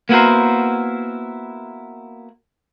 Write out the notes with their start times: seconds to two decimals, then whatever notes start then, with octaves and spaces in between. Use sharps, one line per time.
0.09 A#3 B3 E4 F#4 A#4 C5